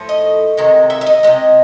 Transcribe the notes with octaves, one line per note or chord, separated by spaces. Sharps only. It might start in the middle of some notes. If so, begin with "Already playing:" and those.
Already playing: A2 F3 A3
D#5
C3 D#3 G#3
E5
E5
D#5
C3 F3 G#3